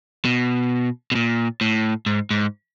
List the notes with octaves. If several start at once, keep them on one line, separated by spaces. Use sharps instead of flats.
B2
B2
A#2
A2
G#2
G#2